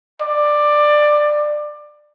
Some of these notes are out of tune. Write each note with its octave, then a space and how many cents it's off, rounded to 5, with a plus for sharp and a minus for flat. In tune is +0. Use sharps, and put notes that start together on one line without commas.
D5 +15